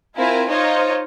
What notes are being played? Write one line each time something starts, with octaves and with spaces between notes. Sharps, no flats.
C4 E4 F4 A#4 G#5
D#4 F4 C5 C#5 D#5